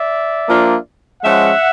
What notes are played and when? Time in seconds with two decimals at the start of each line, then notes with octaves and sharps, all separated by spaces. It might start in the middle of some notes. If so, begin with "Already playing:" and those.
Already playing: D5 E5
0.48 F3 A#3 D4 F4
1.23 F3 G#3 C#4 E5 F#5